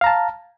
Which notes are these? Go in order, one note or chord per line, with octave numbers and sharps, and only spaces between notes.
F5 A5 A#5